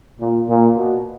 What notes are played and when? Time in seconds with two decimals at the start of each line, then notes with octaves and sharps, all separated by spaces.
0.20 A#2
0.48 A#2
0.76 B2